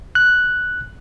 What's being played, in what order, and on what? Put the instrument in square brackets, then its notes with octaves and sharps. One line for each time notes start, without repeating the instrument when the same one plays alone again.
[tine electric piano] F#6